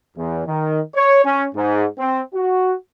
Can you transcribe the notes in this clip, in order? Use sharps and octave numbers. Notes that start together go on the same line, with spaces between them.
E2
D#3
C#5
C#4
G#2
C4
F#4